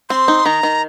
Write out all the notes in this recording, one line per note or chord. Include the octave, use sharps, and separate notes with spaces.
C4 C6
D#4
D#3 A#5
D#3